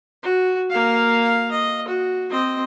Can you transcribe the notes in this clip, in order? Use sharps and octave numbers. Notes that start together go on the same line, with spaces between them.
F#4
A#3 F5
D#5
F#4
C4 D#5